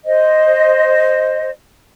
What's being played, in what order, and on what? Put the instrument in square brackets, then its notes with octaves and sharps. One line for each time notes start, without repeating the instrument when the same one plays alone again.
[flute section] C5 D#5